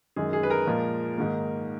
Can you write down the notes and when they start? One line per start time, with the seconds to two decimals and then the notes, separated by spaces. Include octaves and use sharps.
0.16 F#2 D#3 G#3 G#4
0.33 G#4
0.43 B4
0.50 A#4
0.67 A#2 F3 G#3
1.18 G#2 D#3 A#3